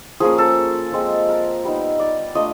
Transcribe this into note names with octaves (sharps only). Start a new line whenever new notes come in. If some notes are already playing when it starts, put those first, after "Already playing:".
F3 A#3 C#4 G#4
A4
F3 G#3 C4
A#4
G3 B3 D#4
D5
A3 D4 F4 D#5